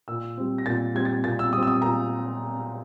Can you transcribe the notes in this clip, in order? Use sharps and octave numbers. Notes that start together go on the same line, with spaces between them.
A#2 E6
G3 C4
A#6
A#2 A6
G3 C4 G#6
A6
A#2 A6
E6
G3 C4 D#6
E6
D#6
A#2 A#5